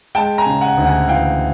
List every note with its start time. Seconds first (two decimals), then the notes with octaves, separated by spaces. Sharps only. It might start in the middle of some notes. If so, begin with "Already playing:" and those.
0.15 G#3 G5 A5
0.38 G#5 A#5
0.46 C#3
0.61 F#5 G#5
0.77 D2
0.85 F#5 G#5
1.08 E3 F5 G5